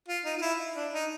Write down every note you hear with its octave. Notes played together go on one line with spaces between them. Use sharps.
F4
D#4
F4
E4
D4
D#4